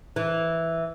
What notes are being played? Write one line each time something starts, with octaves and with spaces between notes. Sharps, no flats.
E3